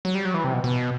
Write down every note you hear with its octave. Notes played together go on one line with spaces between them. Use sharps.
F#3
G3
F#3
E3
C3
B2
B2